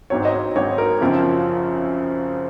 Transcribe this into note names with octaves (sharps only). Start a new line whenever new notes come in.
G#1 G#2 F#3 C4 C#5
D#5
C#5
G#1 G#2 F#3 C4 C#5
A#4
F#2 C#3 F3 C4